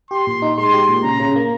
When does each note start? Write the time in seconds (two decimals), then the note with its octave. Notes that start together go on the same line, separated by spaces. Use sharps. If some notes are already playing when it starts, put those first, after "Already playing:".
0.11 G4 C6
0.27 A#2
0.42 D#4
0.58 G#3 C6
0.74 G4
0.89 A#2
1.04 C#3 A#5
1.20 C#3
1.36 A#3